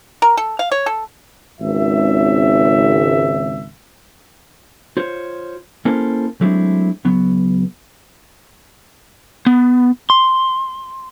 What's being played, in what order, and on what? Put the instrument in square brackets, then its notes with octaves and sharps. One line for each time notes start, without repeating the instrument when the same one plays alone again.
[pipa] A#4
A4
F5
C#5
A4
[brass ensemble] G#1 C#2 E5
[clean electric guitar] F4 C5 C#5
A#3 C#4 E4 A4 A#4 C5
F#3 G#3 A3 C4 D4 E4
C#2 F#3 B3
[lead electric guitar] B3
C6